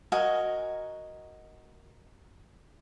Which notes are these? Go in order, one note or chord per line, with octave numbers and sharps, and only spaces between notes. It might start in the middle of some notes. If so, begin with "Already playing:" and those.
F#4 A#4 D#5 G#5